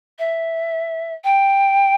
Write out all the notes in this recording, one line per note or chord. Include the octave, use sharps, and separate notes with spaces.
E5
G5